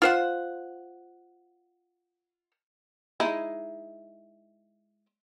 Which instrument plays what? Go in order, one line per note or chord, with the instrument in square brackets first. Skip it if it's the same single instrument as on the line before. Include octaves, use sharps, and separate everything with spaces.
[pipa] F4 C5 F#5
[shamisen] G#3 D#4 E4